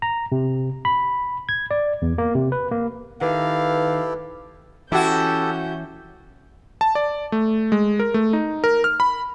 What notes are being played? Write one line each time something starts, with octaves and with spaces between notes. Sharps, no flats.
A#5
C3
B5
G#6
D5
E2
A#3
C3
B4
A#3
D#3 E4 G4 A4 B4 F5
E3 C#4 E4 F#4 G4 A4 G6
A5
D5
A3
G#3
A#4
A3
D#4
A#4
F6
B5